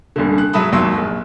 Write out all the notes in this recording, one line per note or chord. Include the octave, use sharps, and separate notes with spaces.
D#1 C2 D3
F#6
G#2 F#3 E5 A5 B5 D#6
G#1 D#2 F#3 C6 E6
A#1